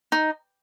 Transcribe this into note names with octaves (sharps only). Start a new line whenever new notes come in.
D#4